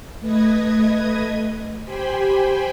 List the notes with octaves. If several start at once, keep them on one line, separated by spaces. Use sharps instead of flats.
A3 B4 D#5 D#6 G#6
G4 C5 G5 G#5 B5